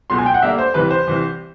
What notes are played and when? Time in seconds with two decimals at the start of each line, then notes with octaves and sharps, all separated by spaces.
0.10 C#2 B2 F#3 C6
0.18 G#5
0.26 G5
0.34 F#5
0.42 D3 G3 A#3 D4 E5
0.58 C5
0.74 C2 C3 E3 B4
0.91 C5
1.07 C2 C3 E3